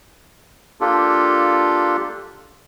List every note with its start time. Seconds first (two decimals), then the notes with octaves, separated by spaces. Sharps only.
0.81 A#3 D4 F4 G4 A4